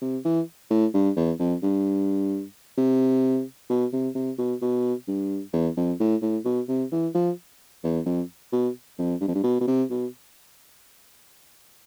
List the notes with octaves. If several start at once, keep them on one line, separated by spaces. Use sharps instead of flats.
C3
E3
A2
G2
E2
F2
G2
C3
B2
C3
C3
B2
B2
G2
E2
F2
A2
A2
B2
C3
E3
F3
E2
F2
B2
F2
G2
F2
G2
B2
B2
C3
B2